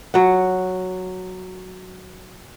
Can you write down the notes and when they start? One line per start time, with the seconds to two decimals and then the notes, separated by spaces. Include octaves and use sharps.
0.14 F#3 F#5